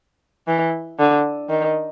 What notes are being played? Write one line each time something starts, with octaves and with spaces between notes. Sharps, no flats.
E3
D3
D#3